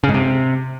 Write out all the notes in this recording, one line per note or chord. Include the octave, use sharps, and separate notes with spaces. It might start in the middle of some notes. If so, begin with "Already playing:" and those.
C#3
G#2
C3